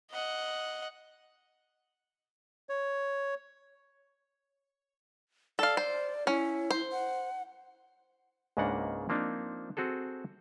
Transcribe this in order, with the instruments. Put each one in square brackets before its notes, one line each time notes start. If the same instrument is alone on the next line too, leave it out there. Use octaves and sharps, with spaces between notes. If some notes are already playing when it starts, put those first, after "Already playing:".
[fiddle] D#5 F#5
[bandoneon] C#5
[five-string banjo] A4 F5 [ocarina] D5
[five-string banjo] C5
[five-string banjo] C#4 [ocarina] E4
[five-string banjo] C5
[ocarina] F#5
[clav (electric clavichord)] C#2 G#2 C#3 A#3 D4 F#5
F3 A#3 C4 D4 D#4
C4 F#4 G#4 A4